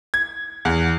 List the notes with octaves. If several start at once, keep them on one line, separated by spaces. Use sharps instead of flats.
G#6
E2